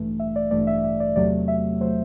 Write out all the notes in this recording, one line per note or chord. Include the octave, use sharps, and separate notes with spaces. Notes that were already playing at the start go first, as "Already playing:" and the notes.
Already playing: A1 G2 E3 A3
E5
D5
A1 G2 E3 A3 D5
E5
E5
D5
E2 C3 F#3 A3 D5
E5
C3 F#3 A3 C5